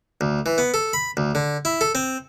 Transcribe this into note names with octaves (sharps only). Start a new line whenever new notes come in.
D2
E3
B3
A4
B5
D2
D3
E4
A4
C4